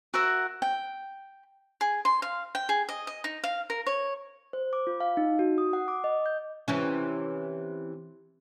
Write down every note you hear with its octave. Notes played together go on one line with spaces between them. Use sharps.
F#4 A#4 E5 F#5
G5
G#4
C6
F5
G5
G#4
D#5
D#5
D#4
F5
A#4
C#5
C5
D6
F4
F5
D#4
F#4
D#6
F#5
D6
D#5
G6
C3 E3 C#4